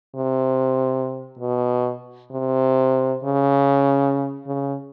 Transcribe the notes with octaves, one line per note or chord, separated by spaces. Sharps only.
C3
B2
C3
C#3
C#3